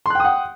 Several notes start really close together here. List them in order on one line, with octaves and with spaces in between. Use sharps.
C6 F#6 G5 D#6 F#5